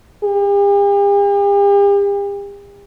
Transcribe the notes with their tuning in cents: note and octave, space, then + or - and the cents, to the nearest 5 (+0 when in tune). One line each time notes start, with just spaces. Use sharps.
G4 +45